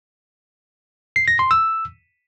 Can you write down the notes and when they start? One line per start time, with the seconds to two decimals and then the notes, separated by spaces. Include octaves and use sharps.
1.16 C7
1.28 A#6
1.39 C6
1.51 E6